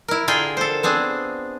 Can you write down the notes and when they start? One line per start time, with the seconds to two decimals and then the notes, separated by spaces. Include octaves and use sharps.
0.08 E4 A#4
0.28 D3 F4 G#4 A#4 G5
0.57 A4 C5
0.83 B3 C4 D4 G#4